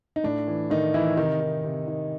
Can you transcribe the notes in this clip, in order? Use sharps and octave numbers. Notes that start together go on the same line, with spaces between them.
D#4
A2 D4
E3
A2 D#3 D#4
E3 E4
C3 D#3 D#4
D#3
C3
D#3